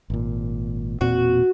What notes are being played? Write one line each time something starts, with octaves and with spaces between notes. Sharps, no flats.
G#1 A#2
E1 A#2 C4 F#4